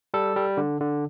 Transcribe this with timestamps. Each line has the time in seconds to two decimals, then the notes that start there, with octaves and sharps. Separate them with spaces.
0.14 G3 A4
0.36 G3
0.57 D3
0.81 D3